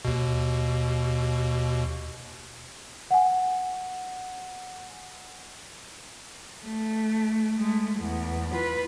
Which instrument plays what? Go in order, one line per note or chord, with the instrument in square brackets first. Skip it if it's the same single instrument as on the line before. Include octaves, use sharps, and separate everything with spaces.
[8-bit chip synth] D#2 B2
[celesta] F#5 G#5
[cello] A3
G#3 A3
E2
F4 B4